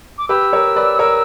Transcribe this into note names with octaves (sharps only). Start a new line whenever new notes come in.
D6
G4 B4 E6
A#4 C#5
B4 D5
A#4 C#5